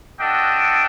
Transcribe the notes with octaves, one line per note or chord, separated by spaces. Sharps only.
D4 F#4 A4 D#5 G5